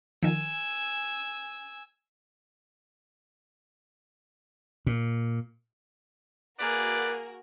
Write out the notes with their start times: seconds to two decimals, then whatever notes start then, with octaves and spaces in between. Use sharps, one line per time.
0.23 D#3 F3 G#5 E6
4.87 A#2
6.59 A#3 F#4 G#4 A#4 B4 D5